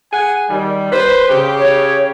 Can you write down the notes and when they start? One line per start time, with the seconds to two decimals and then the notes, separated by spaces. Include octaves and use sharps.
0.11 G#4 F#5 G#5
0.49 D#3 G3
0.90 B4 C5
1.29 C#3 G4
1.59 C#5